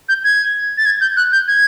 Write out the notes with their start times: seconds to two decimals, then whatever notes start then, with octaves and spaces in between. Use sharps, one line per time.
0.09 G6
0.24 G#6
0.77 A6
0.86 G#6
1.01 G6
1.17 F#6
1.32 G6
1.48 G#6